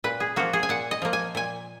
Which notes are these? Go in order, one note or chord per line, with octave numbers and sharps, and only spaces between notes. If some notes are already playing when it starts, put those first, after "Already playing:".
A#2 B4
G#4
F3 A#3 F#4
G#4
G#5
A#2 F#5
D#5
F3 A#3
G#5
A#2 G#5